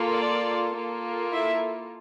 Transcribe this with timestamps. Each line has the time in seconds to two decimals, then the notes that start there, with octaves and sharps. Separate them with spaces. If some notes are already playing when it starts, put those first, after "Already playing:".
Already playing: A#3 F4 A4
0.18 D5
0.75 A#3 F4 A4
1.32 E4 E5